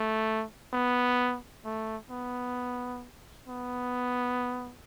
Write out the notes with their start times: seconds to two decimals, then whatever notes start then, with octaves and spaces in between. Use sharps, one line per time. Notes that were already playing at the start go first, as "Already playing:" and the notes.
Already playing: A3
0.73 B3
1.65 A3
2.10 B3
3.48 B3